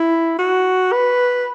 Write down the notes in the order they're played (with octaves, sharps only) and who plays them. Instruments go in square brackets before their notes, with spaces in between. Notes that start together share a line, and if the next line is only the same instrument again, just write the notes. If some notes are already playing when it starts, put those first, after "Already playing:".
Already playing: [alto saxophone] E4
F#4
B4